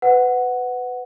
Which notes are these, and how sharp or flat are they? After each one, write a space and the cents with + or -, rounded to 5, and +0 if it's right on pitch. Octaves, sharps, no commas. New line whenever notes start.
B4 +25 F#5 +0